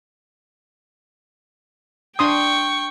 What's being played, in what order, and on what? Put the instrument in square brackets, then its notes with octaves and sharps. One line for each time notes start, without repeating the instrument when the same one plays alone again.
[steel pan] D4 C6 D#6 [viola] G5 C#6